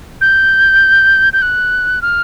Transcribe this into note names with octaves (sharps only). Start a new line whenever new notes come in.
G6
G6
F#6
F6